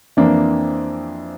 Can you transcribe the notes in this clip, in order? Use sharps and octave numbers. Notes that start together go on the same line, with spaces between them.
F2 E3 A#3 D4